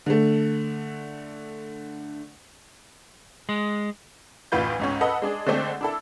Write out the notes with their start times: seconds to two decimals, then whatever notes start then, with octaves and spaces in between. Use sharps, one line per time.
0.06 D3 A3
3.49 G#3
4.52 A1 D2 E3 F4 B4 G6
4.79 C#2 G#2 C#4
5.01 A4 B4 D#5 F#5
5.22 G#3 D4 G#4
5.46 D3 G#3 A3 C4 D4
5.81 D4 E4 A4